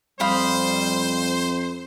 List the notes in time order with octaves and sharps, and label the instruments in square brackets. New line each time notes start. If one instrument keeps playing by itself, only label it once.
[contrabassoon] F2 [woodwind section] G3 [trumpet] C5 [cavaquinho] F5 B5 D#6